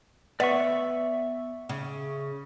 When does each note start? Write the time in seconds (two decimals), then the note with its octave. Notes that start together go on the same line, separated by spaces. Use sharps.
0.40 B3 D5 E5 C#6
1.69 C#3